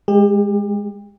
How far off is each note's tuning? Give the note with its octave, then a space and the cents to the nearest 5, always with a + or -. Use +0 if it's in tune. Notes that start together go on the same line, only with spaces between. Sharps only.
G#3 -10 G4 +35